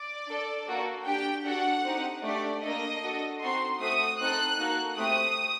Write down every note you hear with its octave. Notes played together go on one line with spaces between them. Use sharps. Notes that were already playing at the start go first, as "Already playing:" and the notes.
Already playing: D5
D4 A4
A#3 F#4 A4
D4 G4 G5
D4 F#4 A4 F#5
C4 D#4 G4
A3 D4 G4 D5
A#3 D4 A4 D#5
D4 F#4 A4
C4 D#4 F#4 A4 C6
A3 C4 F#4 D#6
C4 D#4 A4 F#6
A#3 D#4 F#4 A4
A3 C4 G4 D#6